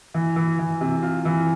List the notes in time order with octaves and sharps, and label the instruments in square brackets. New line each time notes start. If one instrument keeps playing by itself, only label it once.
[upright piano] E3
E3
E3
C3
F4
E3